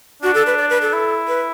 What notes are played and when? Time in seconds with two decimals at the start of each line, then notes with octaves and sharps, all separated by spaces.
0.23 D4 F#4
0.34 A4
0.46 B4
0.58 D5
0.70 B4
0.82 A4
0.93 E4
1.28 B4